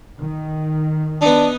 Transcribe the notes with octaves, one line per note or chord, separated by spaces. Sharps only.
D#3
B3 D4 D#4